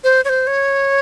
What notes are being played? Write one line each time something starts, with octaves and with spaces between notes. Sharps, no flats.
C5
C#5
C5
C#5